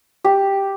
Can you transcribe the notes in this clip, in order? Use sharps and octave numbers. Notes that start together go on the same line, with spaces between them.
G4